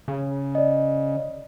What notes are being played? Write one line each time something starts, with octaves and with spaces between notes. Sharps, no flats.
C#3
D5 D#5